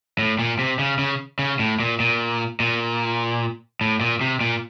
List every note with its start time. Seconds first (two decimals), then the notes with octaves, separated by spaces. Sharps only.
0.19 A2
0.39 A#2
0.59 C3
0.79 C#3
0.99 C#3
1.39 C#3
1.59 A2
1.80 A#2
2.00 A#2
2.60 A#2
3.81 A2
4.01 A#2
4.21 C3
4.41 A#2